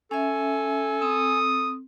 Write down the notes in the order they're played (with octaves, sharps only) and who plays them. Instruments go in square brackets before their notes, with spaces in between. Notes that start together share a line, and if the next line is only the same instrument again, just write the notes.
[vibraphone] C#4 E5 [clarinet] A4 [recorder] G#5
[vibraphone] C4 [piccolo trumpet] D#6